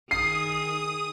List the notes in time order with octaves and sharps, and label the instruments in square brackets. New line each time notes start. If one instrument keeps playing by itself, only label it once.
[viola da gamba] D#3 G#4 [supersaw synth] D#6 [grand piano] C7